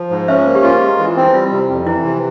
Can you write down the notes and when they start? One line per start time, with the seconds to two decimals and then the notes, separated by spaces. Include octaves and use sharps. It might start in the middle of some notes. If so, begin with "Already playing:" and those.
Already playing: F3
0.10 G#2
0.28 C#4 C5 E5
0.45 A#3
0.55 G4
0.63 F4
0.81 G#3
0.99 E3
1.16 C4
1.22 E4
1.34 G3 F4
1.52 C3
1.69 F2
1.86 E3 E4
2.04 C3